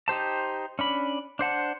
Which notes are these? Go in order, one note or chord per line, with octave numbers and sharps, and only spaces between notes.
D#4 G4 C5 A5
C#4 D4 B5
D4 C5 F#5 A5